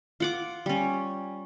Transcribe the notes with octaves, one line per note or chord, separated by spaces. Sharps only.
F4 F#5 D6
G3 C#4